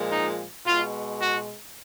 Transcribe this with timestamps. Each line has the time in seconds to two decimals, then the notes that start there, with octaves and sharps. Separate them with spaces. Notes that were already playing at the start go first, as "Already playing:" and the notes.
Already playing: A#2 F3 G#3
0.12 D#4
0.66 B2 G#3 F4
1.21 F#4